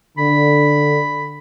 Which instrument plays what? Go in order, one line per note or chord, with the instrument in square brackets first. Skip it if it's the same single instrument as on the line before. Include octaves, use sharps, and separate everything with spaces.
[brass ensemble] D3 [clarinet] B5